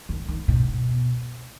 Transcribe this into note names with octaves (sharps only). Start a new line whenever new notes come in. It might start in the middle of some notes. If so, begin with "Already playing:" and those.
D#3
D#3
B2